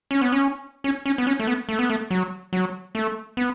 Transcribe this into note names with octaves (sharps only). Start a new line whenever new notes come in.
C#4
B3
C#4
C#4
C#4
B3
C#4
A3
B3
A3
B3
A3
F#3
F#3
A3
B3